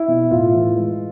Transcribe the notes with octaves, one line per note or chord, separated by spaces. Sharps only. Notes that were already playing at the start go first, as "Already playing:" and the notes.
Already playing: E4
B2
A2 F4
E3
G#3